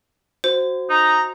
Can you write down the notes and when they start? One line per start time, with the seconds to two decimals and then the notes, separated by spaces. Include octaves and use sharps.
0.44 F#4 C5
0.90 D#4 A#5